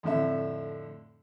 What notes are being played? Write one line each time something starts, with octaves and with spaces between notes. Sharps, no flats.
F2 A2 D3 E5